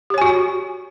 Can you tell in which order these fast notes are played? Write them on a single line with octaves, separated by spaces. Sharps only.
G4 C#5 G#5 F#4